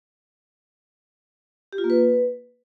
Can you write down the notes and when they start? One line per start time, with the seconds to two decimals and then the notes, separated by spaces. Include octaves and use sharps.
1.73 G4
1.78 F4
1.84 A#3
1.90 B4